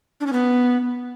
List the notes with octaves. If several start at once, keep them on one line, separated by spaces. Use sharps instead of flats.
D4
C#4
B3